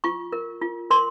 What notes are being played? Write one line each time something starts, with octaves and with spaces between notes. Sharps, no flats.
F4 C#6
A#4
F4
A#4 C6